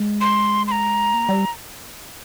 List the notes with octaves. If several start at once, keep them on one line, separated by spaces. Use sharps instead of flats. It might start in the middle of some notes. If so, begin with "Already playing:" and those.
Already playing: G#3
C6
C6
A#5
A#3
G3